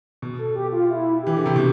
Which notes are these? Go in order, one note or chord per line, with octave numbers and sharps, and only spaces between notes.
B2
A4
G4
F4
E4
E3 G4
D3
C3
B2